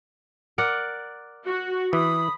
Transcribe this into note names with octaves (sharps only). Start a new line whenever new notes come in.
A#4 D5 F#5
F#4
E3 B5 D#6